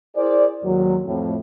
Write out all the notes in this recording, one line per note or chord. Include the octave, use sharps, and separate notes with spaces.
E4 G#4 A#4 C5 D5
D#2 G#2 D#3 F#3
F2 A2